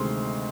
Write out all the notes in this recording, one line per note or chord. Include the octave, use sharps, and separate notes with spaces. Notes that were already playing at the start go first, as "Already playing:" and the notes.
Already playing: D2 C3 D#3 G#3 C4 C6